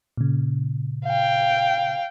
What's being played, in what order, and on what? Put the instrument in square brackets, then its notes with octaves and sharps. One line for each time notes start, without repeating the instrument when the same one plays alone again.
[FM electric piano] A#2 C#3
[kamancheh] F5 G5